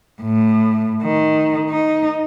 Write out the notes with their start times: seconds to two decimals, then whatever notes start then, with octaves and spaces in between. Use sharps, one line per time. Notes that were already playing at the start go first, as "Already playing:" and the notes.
0.22 A2
1.03 D#3
1.70 D#4